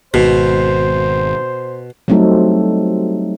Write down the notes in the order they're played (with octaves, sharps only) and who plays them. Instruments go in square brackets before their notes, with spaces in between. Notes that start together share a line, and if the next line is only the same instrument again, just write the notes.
[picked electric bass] G#1 [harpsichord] B2 [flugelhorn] C5
[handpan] F#3 G3 A3 C4 D#4 A4